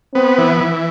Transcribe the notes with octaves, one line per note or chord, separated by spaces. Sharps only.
B3 C4
E3
E3